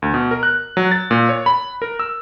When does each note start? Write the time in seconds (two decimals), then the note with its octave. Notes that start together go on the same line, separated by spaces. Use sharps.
0.02 D2
0.14 B2
0.31 A#4
0.43 F#6
0.77 F#3
0.91 A6
1.11 A#2
1.29 C#5
1.46 B5
1.82 A#4
1.99 E6